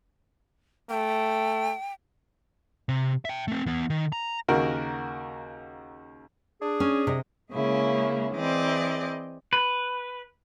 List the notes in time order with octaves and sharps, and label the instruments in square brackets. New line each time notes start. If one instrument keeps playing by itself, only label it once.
[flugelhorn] A3 [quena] G5
[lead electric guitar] C3
E5 G5
A3 C4
E3 B3
D#3
A#5
[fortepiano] D#2 C#3 F#4 A#4
[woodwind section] D4 G#4
[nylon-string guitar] C#4
C3 D#5
[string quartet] C#3 G#3 A#3 C#4 E4
E3 C4 G#4 D5 D#5
[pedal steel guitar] B4